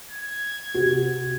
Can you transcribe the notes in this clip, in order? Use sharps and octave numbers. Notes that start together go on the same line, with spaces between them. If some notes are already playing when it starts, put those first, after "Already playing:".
G#6
C3 F#4